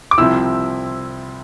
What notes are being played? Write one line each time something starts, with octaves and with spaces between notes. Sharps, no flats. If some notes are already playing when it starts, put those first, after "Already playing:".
D6
C2 C3 F3 C4 E4 E6